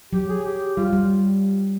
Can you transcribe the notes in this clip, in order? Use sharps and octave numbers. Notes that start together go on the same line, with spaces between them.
F#3 G4
G#4
G4
G3 F4
G3